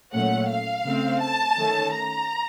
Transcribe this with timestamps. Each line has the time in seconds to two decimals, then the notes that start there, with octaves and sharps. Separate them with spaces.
0.13 A#2 F#3 A3 C#4 F#5
0.49 F5
0.85 C#3 A3 C4
1.21 A5
1.57 D#3 A3 C#4
1.92 A#5